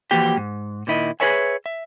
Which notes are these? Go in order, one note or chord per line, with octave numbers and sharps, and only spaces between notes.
E3 F3 A#3 F#4 G4 G5
G#2
A#2 D#3 E4 D#5
G#4 A#4 B4 C#5 E5 G#5
E5